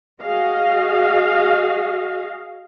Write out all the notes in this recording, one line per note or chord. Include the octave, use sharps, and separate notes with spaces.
F#4 G#4 D#5 F5